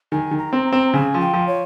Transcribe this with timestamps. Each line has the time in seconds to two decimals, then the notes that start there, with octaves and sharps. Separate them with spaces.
0.12 D#3 G#5
0.31 D#3
0.38 A#5
0.53 C4
0.66 A#5
0.72 C4
0.87 A#5
0.93 C#3 G#5
1.14 F3
1.21 G5
1.34 F3
1.47 C#5